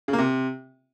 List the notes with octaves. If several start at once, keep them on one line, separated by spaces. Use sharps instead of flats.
C#3
A#3
C3